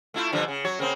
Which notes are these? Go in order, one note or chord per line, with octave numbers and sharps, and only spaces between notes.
A3 E4 F4
G2 D3 F3
C#3
F#3 C#5
C#3 A#3 C4